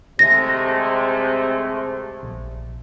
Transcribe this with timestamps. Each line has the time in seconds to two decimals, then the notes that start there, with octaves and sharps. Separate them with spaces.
0.19 C3 G#3 A3 A#6
2.23 A#1